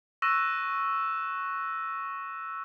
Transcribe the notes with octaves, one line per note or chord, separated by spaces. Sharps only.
C#6 E6 F#6 A#6 D#7 E7